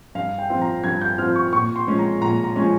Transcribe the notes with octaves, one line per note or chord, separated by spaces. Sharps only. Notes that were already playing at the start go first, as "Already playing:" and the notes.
G2 F5
G5
F3 C4 F4
A#5
G2 G#6
G6
F3 C4 F4 F6
C#6
A#2 C#6
C6
F3 G#3 C#4
A#5
A#2 A#5
A#5
F3 G#3 C#4